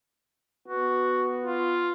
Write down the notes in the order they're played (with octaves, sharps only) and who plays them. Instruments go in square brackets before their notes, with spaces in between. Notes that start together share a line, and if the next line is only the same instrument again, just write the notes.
[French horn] B3 [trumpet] F#4
[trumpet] F4